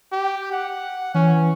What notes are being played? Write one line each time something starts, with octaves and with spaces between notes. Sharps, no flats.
G4
F#5
E3 C#4